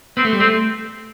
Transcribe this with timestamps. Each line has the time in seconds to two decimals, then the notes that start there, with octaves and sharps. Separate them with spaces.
0.17 B3 C4
0.25 A3
0.33 G3
0.40 A3 C4